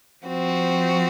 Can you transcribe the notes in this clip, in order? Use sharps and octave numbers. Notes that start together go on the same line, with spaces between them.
F3 C4 F#4